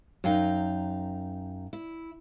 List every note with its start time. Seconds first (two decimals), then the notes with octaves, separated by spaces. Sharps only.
0.24 F#2 D#4 F5 G5
1.73 E4